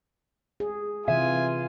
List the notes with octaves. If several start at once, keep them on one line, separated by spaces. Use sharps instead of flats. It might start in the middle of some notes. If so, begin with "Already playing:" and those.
G#4
C3 E3 F4 E5 G#5